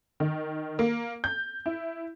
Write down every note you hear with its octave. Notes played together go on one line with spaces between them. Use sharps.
D#3
A#3
G6
E4